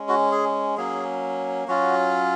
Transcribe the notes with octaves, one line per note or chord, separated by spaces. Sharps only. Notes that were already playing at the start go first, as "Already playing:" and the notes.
Already playing: G#3 C#4
F#4
G#4
F#3 A#3 C#4 G#4
F#3 C#4 F4 F#4